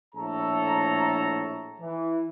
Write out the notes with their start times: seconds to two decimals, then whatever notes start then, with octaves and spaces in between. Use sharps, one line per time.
0.15 A#1 A2 A4 C#5 A#5
1.80 E3